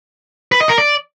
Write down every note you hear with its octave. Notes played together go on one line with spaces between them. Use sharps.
B4
D#5
A#4
D5